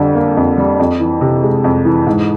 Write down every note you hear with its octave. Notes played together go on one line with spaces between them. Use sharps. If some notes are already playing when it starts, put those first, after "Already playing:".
Already playing: F2 D3 G3
A#3
F2
G3
F2
E3
C3
G#3
F2
E3
G#2